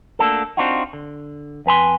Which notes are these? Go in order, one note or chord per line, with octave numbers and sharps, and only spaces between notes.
A3 A#3 D4 F#4 A4
C4 D4 D#4 F4 F#4
D3
F2 B4 G#5 C6